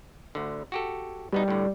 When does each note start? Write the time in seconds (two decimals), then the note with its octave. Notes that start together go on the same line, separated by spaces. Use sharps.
0.35 D2 D3
0.72 F#4 G4 A4
1.32 B2 G3 B3 D#4
1.48 A2 D3